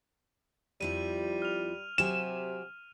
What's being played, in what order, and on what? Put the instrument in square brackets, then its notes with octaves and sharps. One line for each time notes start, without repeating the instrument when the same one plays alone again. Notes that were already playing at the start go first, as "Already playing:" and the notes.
[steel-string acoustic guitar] F2 F3 E4 [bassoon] G3 [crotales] D#7
[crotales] F6 F7
[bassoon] C3 [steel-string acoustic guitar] F#3 G4 G#5 [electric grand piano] E7